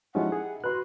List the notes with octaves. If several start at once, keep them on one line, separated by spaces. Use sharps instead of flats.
F3 G#3 C#4 D#4 E4 G4 F#5
G#4
F#4 B4 C6 F#6